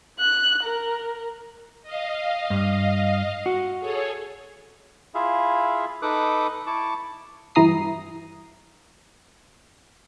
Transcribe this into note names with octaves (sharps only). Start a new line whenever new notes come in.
F#6
A#4
D#5 F5
G2
F#4
G#4 A4 C#5
E4 F4 G#4 E5 F5
D#4 A4 B4 D6 D#6 F#6
E4 A5 C#6 D6
G2 E3 E4 A#5 D#6 C7